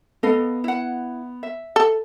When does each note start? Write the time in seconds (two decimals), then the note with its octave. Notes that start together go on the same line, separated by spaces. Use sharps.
0.23 B3 A4 D#5 F5
0.64 E4 F#5
1.43 E5
1.76 A4